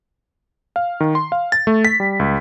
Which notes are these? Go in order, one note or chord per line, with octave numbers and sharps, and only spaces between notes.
F5
D#3
C6
F5
A6
A3
B6
G3
C#2